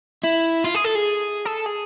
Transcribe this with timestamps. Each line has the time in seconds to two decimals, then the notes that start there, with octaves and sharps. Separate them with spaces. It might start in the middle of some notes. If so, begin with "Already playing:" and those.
0.24 E4
0.64 F4
0.75 G#4
0.85 A4
0.95 G#4
1.46 A4
1.66 G#4